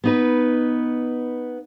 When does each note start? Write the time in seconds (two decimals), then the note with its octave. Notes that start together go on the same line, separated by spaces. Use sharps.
0.04 B3 D#4 B4